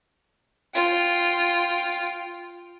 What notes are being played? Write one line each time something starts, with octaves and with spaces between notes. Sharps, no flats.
F4 G5